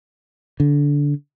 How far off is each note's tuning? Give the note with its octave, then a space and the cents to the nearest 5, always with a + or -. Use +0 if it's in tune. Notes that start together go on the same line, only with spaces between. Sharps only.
D3 -20